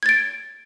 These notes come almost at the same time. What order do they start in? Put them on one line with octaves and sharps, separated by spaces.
G#6 A6 D7